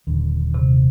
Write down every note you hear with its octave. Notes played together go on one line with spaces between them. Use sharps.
D#1 D3
C3